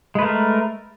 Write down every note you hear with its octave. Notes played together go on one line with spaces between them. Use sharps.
G#3 A3 A#4 B4